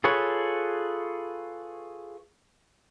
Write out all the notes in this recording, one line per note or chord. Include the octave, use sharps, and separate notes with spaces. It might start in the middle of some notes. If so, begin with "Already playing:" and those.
F4 G#4 A4 B4 C#5